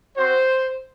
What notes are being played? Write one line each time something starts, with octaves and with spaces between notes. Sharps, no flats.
C4 F#4 C5